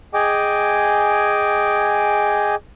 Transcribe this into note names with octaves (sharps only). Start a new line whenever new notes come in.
G#4 D#5 G5 G#5 D6